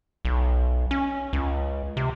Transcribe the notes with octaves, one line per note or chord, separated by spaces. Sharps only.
B1
C#4
C#2
C3